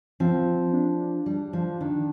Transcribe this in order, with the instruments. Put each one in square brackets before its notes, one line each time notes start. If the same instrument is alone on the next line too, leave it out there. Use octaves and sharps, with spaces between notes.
[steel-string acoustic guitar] F3 [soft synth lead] C4
[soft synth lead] D4
[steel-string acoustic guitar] G3
F3
[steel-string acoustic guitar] D#3 [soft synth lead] D4